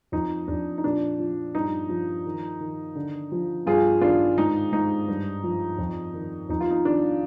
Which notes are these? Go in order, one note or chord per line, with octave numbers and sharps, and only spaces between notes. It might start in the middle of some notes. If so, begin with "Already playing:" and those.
F2 D#4
F2 D4
D#4
A#2 D4
F3
G2 D#4
F3
D#3
D#3
D3
F3
G2 F4 G#4
D#3 D4 F4
G#2 D#4
G#2 D#4
G2
F3
F2
D#3
F2 D#4
F4
D#4
D#3 D4